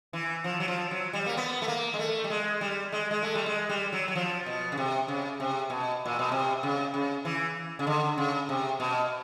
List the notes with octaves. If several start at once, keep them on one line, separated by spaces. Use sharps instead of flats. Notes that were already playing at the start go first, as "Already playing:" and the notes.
E3
F3
F#3
F3
F#3
G3
A#3
B3
A3
A#3
G#3
A3
G3
G#3
G3
G#3
G#3
A3
G3
G#3
G3
F#3
F#3
F3
B2
C#3
C3
C#3
C3
B2
A#2
B2
C3
C#3
C#3
E3
C#3
D3
C#3
C3
B2